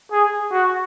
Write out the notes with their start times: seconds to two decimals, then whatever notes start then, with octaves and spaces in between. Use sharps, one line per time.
0.11 G#4
0.51 F#4